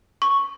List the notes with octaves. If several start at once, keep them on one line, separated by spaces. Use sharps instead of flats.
C#6